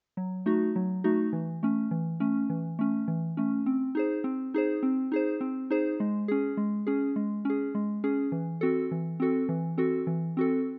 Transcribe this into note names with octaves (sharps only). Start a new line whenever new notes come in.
F#3
A3 D#4 F#4
F#3
A3 D#4 F#4
E3
A3 C#4
E3
A3 C#4
E3
A3 C#4
E3
A3 C#4
C4
D#4 G#4 C5
C4
D#4 G#4 C5
C4
D#4 G#4 C5
C4
D#4 G#4 C5
G#3
C#4 G#4
G#3
C#4 G#4
G#3
C#4 G#4
G#3
C#4 G#4
E3
C4 F#4 A4
E3
C4 F#4 A4
E3
C4 F#4 A4
E3
C4 F#4 A4